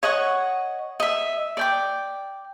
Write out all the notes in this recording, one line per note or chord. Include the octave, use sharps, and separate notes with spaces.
C#5 D#5 F#5 C#6
D#5 E5
D5 G5 D6